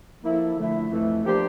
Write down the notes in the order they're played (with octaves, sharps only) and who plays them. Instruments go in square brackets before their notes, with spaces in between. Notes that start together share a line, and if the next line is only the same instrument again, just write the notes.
[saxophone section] F3 A#3 E4 A4
D3 F3 A3 E4
F2 E3 A3
F3 A#3 D4 G4 C5